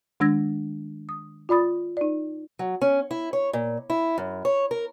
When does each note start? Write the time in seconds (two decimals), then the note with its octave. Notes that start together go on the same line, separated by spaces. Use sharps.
0.20 D#3 G#3 D4 E6 G#6 A#6
1.09 D#6
1.49 F4 D5 B5 D#6 A6
1.97 D#4 D5
2.59 F#3
2.82 C#4
3.11 E4
3.33 C#5
3.53 A#2
3.90 E4
4.18 F#2
4.45 C#5
4.71 A#4